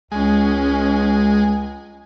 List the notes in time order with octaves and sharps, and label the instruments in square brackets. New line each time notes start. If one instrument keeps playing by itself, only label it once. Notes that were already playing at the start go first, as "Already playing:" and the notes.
[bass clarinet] C#2 [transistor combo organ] G#3 [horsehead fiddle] C#4